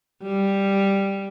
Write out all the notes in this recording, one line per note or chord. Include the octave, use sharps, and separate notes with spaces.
G3